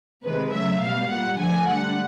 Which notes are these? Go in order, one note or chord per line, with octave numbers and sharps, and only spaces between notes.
C3 D#3 G#3 B4
C#3 F#3 A3 E5
B2 G3 F5
A#2 G3 F#5
D3 F3 A3 G#5
D3 G3 F#5